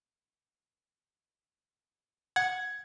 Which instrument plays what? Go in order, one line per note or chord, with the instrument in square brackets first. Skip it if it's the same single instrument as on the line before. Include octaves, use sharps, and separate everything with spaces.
[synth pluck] F#5 [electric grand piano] G#6